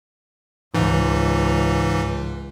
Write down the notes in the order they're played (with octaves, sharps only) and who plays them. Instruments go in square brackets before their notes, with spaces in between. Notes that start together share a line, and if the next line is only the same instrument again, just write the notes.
[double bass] C#2 [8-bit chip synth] G#2 E3